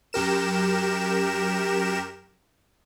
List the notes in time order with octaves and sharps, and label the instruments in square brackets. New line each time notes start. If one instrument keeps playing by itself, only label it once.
[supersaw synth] F#2 G4 A#4 E7